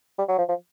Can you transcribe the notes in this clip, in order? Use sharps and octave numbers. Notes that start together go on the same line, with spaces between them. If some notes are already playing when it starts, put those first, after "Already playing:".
G3
F#3
F3
F3